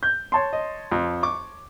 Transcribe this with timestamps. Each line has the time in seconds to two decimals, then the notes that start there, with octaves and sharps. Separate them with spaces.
0.03 G6
0.32 C#5 A5 C6
0.53 D#5
0.92 F2
1.23 C#6 D6